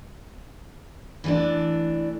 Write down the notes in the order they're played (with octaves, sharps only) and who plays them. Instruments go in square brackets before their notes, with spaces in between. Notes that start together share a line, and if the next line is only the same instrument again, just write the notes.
[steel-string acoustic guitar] E3 A3 D4